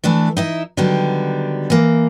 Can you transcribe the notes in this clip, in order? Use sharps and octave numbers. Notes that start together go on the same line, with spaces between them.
E3 A3 D4 A4
D#4 E4 E5
D3 D#3 F#3 G3 B3
E3 A#3